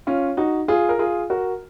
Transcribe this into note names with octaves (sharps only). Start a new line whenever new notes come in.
C#4 F4
D#4 F#4
F4 G#4
A#4
F4 G#4
F#4 A#4